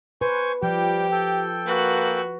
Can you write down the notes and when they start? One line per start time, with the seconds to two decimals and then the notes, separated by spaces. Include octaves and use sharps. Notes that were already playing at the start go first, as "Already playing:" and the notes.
0.21 B4 C5 G#5 C#6
0.63 F3 G3 G4 G5
1.11 A4 G5
1.66 A#3 F#4 B4